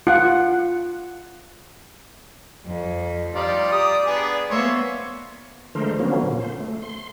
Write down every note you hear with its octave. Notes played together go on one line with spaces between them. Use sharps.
F4 F#5
F2
G3 D#4 F4 D5
G4 A#5 D#6
B3 D4 G#4
A#3 B3 C5 C#5 E5
D3 F3 G#3 A3 A#4 C5
D3 F3 F#3 A#3 B3 C#4
A#2
C5
A3
C6